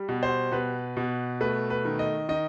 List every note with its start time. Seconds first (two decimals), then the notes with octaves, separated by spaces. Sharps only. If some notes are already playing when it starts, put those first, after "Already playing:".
Already playing: G3
0.09 B2
0.23 C5
0.52 B2 B4
0.97 B2
1.41 A3 B4
1.70 B4
1.85 D#3
1.99 D#5
2.29 D#3 D#5